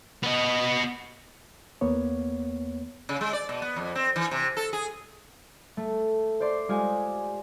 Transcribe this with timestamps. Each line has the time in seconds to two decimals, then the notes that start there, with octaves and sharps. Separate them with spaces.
0.24 B3 D#5
1.81 E2 A#3 B3 C#5
3.09 C#3
3.21 G#3
3.33 D5
3.49 B2
3.62 B3
3.76 F2
3.95 C4
4.16 E3
4.31 C3
4.57 A4
4.73 G#4
5.77 A3
6.40 C5 D5 C6
6.69 G#3 F4 G4 G#5